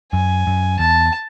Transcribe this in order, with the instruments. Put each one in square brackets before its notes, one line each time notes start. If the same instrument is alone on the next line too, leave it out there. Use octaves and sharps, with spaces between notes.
[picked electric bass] F#2 [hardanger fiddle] G#5
[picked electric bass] F#2
[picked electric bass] E2 [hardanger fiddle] A5